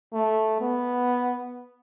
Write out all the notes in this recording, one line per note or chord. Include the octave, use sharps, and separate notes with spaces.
A3
B3